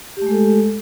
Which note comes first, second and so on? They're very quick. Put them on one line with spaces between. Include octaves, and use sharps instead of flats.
G4 A3 G#3 A4